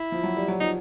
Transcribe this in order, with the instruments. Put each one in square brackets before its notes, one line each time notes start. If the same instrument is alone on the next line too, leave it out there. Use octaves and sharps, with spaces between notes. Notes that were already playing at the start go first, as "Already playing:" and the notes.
Already playing: [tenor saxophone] E4
[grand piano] F3
F#3
G3
F#3
[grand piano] F3 [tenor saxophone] D#4